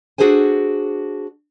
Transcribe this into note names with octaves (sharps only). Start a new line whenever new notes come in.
D4 F#4 G#4 A4 C5 G#5